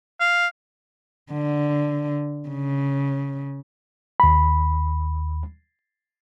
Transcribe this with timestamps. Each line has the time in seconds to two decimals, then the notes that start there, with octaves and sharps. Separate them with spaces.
0.20 F5
1.32 D3
2.49 C#3
4.20 D#2 B5